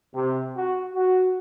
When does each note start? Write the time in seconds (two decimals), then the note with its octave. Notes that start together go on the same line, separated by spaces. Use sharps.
0.14 C3
0.57 F#4
0.96 F#4